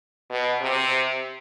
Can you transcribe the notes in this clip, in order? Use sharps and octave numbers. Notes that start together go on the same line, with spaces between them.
B2
C3